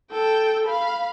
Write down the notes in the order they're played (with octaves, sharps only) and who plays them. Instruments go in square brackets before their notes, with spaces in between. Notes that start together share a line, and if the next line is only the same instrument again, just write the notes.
[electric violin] A4 G5
F5 B5